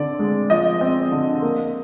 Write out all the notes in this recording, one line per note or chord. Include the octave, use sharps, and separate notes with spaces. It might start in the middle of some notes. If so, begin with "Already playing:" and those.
Already playing: D3 C4 D5
G#3
F3 D#5
C4
D3
A#3